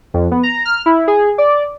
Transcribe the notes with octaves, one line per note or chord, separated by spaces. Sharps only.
F2
B3
A#5
F6
E4
G#4
D5